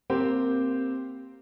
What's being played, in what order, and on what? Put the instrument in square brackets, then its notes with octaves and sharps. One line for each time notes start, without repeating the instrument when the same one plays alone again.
[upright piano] A#3 C4 G4 C5